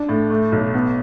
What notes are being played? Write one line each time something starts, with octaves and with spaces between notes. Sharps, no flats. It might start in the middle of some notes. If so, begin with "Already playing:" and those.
Already playing: D4
A2
A3
B1
B3